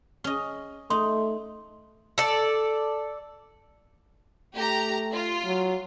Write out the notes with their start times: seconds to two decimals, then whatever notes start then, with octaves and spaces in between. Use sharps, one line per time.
0.24 C#4 D#5
0.90 A3 D#4 C6
2.18 A4 D5
4.57 A3 G4 A#5
5.14 F4
5.44 F#3